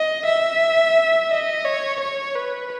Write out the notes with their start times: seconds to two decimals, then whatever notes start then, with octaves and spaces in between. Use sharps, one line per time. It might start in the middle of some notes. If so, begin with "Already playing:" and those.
Already playing: D#5
0.26 E5
1.30 D#5
1.65 C#5
2.00 C#5
2.35 B4